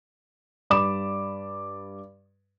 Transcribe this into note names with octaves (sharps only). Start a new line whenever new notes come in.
G2 D5 B5 D6 E7